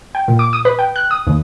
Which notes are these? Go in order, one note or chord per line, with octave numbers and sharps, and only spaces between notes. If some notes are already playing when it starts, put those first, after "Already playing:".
G5
A#2
D6
D#6
B4
G5
F#6
D#6
D#2